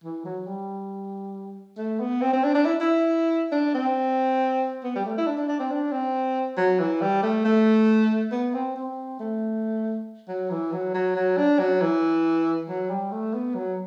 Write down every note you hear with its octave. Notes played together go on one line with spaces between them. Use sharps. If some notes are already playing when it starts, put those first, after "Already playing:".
E3
F#3
G3
A3
B3
C4
C4
D4
D4
E4
E4
D4
C4
B3
G3
A3
E4
D4
D4
D4
C4
D4
C4
F#3
E3
G3
A3
A3
B3
C4
C4
A3
F#3
E3
F#3
F#3
F#3
D4
F#3
E3
F#3
G3
A3
B3
F#3